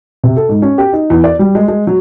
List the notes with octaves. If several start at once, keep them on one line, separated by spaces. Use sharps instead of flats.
C3
A4
G#2
C#4
G4
D#4
E2
D5
G3
G#3
G#3
F#3